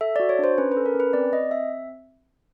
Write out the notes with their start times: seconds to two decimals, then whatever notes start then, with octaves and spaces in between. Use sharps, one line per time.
0.01 A4 E5
0.16 F#4 D5
0.29 C#5
0.39 D4 C5
0.58 C#4 B4
0.72 B4
0.77 A4
0.86 A#4
0.95 C#4
1.00 B4
1.13 C4 D5
1.33 C4 D#5
1.51 C4 E5